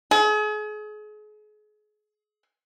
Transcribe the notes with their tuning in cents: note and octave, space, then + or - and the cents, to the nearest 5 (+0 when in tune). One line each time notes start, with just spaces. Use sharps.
G#4 +35